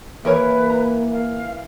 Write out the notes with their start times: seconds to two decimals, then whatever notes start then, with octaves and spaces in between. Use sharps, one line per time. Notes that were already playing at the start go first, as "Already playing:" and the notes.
0.25 E3 A#3 G4 A#4 B4 C#5
0.70 A#5
1.12 F5